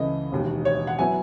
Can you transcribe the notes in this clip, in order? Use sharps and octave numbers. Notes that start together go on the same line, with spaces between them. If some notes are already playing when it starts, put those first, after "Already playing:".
Already playing: C#2 C#3 E3 A3 D#5
E1 D#2 D#3
C#5
F#5
F#3 B3 E4 G#5